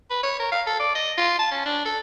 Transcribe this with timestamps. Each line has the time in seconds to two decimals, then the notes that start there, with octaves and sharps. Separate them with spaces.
0.10 B4
0.23 C#5
0.40 A#4
0.52 F5
0.67 A4
0.80 D5
0.95 D#5
1.18 F4
1.39 A5
1.51 C#4
1.65 D4
1.85 A4